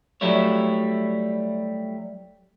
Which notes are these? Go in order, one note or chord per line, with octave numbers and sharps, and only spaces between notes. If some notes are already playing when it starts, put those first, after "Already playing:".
F#3 G3 A3 E4 C#5